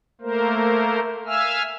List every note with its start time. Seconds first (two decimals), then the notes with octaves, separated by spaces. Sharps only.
0.21 A3 A#3 A#4 C5
1.27 E5 F5 G#5 E6 F6